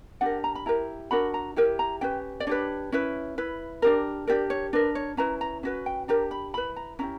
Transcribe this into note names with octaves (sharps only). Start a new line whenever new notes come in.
D4 G4 A#4 F#5
A#5
B5
E4 G4 A#4 A#5
D4 F#4 A#4 B5
A#5
E4 G4 A#4
A#5
C#4 G4 B4 G5
D5
D4 G4 B4 C#5
C#4 E4 B4
E4 B4
D4 G4 A#4
D4 G4 A#4 D5
C#5
D4 A#4 B4
C#5
C#4 E4 B4 A#5
A#5
C#4 F#4 B4
G5
D4 G4 A#4 A#5
B5
E4 B4 B5
A#5
C#4 E4 G4 A#5